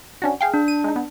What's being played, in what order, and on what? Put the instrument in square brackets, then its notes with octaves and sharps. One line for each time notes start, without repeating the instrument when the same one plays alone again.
[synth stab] C#4 D4 F#4
G#4 F5 G5
[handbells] D4
[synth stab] D#7
G#3 D#4
B3